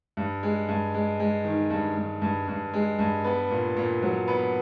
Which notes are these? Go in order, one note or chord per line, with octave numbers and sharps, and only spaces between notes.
G2
G#3
G2
G#3
G#3
D#3
G2
G2
G2
G2
G#3
G2
B3
A#2
A#2
F#3
B3